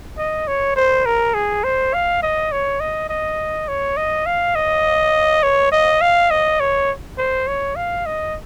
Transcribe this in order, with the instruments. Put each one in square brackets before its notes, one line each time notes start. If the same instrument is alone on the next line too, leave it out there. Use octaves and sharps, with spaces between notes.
[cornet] D#5
C#5
C5
A#4
G#4
C5
F5
D#5
C#5
D#5
D#5
C#5
D#5
F5
D#5
C#5
D#5
F5
D#5
C#5
C5
C#5
F5
D#5